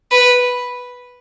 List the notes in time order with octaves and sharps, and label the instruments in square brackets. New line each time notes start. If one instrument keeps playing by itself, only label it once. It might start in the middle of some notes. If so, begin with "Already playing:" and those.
[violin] B4